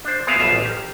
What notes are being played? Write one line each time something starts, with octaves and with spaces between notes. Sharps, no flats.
D4 C5
B3 C4 G#4 A#4 E5 F5
B1 B2 G3 F4 E5 F5
A1
G4 A#4